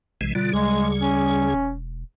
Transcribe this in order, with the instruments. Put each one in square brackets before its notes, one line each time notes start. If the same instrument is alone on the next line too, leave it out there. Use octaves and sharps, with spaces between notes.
[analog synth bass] B1 [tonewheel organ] C3 E3 G#3
[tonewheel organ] B2 D3 F4 [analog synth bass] G3
[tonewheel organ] D2 C#3 G#4 [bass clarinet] G#3
[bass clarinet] C#4
[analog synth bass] E1